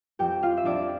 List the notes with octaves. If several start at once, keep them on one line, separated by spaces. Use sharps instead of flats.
F2 G4 G5
F4 F5
E5
F2 D4 D5